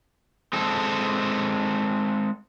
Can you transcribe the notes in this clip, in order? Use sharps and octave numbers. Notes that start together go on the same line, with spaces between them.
G#3 C4 A4